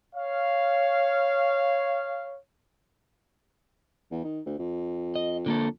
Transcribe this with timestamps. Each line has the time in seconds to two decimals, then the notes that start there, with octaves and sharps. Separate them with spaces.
0.15 C#5 F5
4.11 E2
4.24 D#3
4.46 D2
4.59 F2
5.15 D#5
5.46 D3 A#3 A4